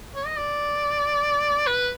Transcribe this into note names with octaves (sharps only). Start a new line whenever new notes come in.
C#5
D#5
D5
B4